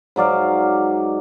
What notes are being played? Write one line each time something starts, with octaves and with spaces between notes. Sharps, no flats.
G#2 F#3 D5 F5